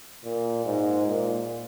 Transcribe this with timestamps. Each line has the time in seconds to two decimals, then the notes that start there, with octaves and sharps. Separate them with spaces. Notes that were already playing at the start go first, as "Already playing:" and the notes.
0.24 A#2
0.65 G#2
1.06 A#2